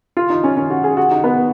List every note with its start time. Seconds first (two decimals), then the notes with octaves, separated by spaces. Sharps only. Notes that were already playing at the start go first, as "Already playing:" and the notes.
0.17 F4
0.30 D#4
0.44 C#4
0.57 C#4
0.70 F#4
0.84 G#4
0.97 F#4
1.11 D#4
1.24 B3